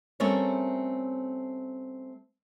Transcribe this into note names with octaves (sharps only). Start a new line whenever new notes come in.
G3 A3 C4 C#4 A#4 C#5